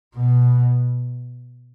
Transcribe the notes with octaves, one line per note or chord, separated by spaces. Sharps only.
B2